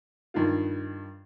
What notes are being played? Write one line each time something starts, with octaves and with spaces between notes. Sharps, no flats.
G2 D#3 F4